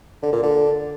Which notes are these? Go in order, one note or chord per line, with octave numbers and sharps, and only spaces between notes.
D3
A#2
D3